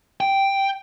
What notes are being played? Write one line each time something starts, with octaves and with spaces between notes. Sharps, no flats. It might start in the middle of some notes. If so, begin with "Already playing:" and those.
G5